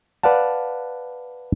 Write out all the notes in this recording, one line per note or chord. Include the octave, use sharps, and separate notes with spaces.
B4 D5 F5 F#5 A5